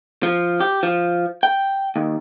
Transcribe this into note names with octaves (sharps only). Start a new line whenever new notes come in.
F3
G4
F3
G5
D#2